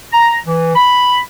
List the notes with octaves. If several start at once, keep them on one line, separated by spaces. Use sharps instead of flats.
A#5
E3
B5